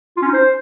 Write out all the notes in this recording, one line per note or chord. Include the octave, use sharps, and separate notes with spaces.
F4
C#4
D#4
C5